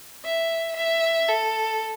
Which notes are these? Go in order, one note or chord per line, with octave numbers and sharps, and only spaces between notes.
E5
E5
A4